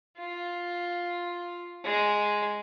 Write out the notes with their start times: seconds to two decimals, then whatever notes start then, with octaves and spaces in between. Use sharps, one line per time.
0.18 F4
1.84 G#3